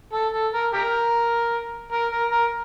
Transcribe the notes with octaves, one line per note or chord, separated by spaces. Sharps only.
A4
A4
A#4
G4 A#4
A#4
A#4
A#4